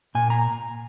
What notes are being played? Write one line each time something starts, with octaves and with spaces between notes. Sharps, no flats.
A#2 G#5
A#5